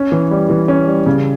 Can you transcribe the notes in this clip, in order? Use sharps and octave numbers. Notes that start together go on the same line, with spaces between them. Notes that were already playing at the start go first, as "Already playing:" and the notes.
Already playing: C#4
E3
G3
E3
C#4
G3
C#3